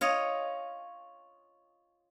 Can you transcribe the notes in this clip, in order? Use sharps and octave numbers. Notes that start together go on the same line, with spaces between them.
F4 C#5 D#5